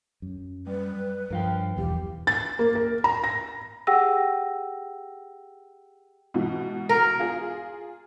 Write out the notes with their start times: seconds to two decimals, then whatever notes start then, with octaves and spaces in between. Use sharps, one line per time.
0.22 F#2
0.67 G3 B4
1.31 G2 F3 A#4 F5 G5
1.78 E1 B1 E2 G4
2.27 A6
2.59 A#3
2.75 A#4
3.04 A#5
3.24 A#6
3.87 G4 G#4 F#5 G5 E6 A#6
6.34 G#2 B2 E3
6.89 A#4
7.19 F4 G#4